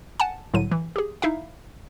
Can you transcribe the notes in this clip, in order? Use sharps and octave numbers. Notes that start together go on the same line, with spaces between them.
F#5 G#5 A5
C2 A2 D3 F#3 D#7
E3
G4 G#4
D#4 E4 E5 F5